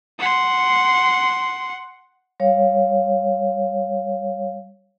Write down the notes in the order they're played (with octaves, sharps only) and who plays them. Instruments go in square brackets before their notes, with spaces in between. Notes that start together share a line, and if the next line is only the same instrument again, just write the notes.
[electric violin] F#5 C6
[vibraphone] G3 C#5 F5